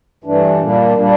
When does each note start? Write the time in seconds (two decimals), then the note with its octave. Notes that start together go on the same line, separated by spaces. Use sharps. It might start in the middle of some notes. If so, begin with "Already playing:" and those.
0.24 G2 E3 A3 D4
0.60 A#2 G3 A#3 D4
0.97 A#2 G3 A#3 D4